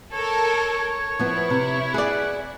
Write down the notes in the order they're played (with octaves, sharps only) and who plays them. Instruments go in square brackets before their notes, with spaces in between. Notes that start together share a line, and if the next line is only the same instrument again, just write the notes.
[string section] A4 A#4 [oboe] C#5
[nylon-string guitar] F3 B3 [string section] E4
[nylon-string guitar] C3
[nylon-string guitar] G#4 D5 [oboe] F#5